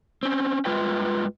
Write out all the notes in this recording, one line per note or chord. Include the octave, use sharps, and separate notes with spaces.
C4 C#4
G2 G#3 F4 B4 G5